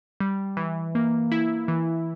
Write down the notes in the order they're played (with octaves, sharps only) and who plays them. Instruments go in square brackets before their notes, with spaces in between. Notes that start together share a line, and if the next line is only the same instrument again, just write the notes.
[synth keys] G3
E3
A#3
E4
E3